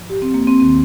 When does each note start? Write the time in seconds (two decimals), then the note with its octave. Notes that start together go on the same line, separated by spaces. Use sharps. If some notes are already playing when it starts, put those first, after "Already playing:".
Already playing: G#2 F3
0.10 G4
0.22 C4
0.34 A#3
0.47 C4
0.60 D#2 D#3 C4